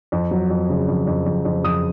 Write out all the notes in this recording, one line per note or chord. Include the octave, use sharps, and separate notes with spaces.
F2
F#3
F2
C#3
F2
F2
F2
F2
F2 D#6